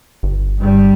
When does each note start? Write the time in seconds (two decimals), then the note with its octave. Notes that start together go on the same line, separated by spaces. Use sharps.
0.23 G1
0.58 G2 G3